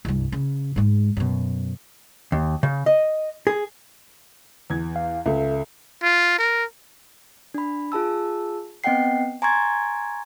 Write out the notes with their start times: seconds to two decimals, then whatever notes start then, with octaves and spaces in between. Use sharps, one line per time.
0.05 C2 G2
0.32 C#3
0.76 G#2 G#3
1.17 F#2 B2
2.32 D#2
2.63 C#3
2.86 D#5
3.47 G#4
4.70 E2 G#6
4.96 F5
5.26 C#2 A4 E5
6.03 F4
6.39 A#4
7.54 D4 B5
7.92 F4 G#4 A5 E6
8.84 B3 C4 D#5 F#5 G5 C7
9.42 G#5 A#5 C6 C#6 G#6 A6